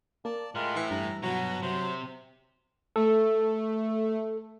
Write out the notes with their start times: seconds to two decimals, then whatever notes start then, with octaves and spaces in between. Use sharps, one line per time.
0.25 A#3 D5 A5
0.55 A2 G#3 F4 A#4 F#6
0.76 E3
0.91 G2 A#5
1.23 B2 F#3 F#4 A#5
1.62 C3 F#3 C5
2.96 A3 A4